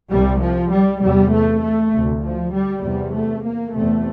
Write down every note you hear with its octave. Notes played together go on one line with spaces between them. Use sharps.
C2 C3 G3
F3
G3
E2 C3 G3
A3
A3
D2 C3
F3
G3
E2 C3 G3
A3
A#3
E2 C3 A3